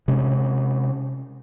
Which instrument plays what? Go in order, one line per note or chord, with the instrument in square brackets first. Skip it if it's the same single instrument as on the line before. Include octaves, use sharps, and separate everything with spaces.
[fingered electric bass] C3 G#3 C#4